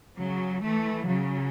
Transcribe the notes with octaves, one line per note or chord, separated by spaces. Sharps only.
C#3 F#3
E3 A3
C#3 F#3